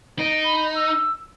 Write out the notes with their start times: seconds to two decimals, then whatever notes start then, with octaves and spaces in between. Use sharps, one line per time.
0.19 D#4 D7
0.44 B5
0.75 E6